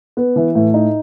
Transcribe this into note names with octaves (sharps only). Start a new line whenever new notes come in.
B3
E3
A2
D#4